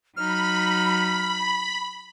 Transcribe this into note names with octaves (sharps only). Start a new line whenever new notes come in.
F#3 D#4 B5 F6